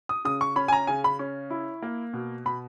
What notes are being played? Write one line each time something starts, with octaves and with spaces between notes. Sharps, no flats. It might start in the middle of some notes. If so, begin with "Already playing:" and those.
D#6
C#3 D#6
C#6
C#4 B5
G#5
A#5
C#3 G#5
B5
C#4
E4
A#3
B2
B2 B5